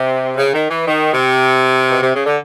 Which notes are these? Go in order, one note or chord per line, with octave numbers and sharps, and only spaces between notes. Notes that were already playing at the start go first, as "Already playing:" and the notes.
Already playing: C3
C#3
D#3
E3
D#3
C3
B2
C3
C#3
D3